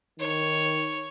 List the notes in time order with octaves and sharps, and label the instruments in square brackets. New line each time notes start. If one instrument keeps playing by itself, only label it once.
[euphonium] D#3 [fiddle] C#5